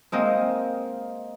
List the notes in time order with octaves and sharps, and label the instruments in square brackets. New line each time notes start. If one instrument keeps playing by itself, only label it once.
[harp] G#3 A#3 C4 D#5